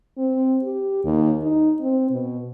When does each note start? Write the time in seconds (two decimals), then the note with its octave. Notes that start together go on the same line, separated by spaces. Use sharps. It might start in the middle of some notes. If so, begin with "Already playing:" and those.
0.18 C4
0.63 G4
1.04 D#2
1.43 D#4
1.81 C4
2.11 B2